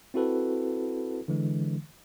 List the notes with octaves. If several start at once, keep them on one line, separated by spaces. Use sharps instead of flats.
C4 E4 F#4 A4 B4
D3 E3 G#3